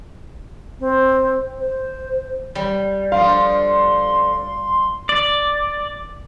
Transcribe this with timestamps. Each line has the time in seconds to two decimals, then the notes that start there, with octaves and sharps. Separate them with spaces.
0.80 C4
1.59 C5
2.55 G3
3.12 D3 F3 D4 F5 C6
5.09 D5